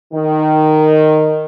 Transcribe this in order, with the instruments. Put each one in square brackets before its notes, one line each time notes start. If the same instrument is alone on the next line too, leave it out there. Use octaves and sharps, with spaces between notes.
[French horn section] D#3